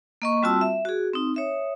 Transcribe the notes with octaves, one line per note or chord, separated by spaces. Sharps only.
A#3 D#5 C#6
G3 C4 F4 F#4 A5 E6
E5
F#4 G#4
C4 D#4
C#5 E5 D#6